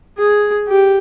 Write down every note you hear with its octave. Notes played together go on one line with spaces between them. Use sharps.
G#4
G4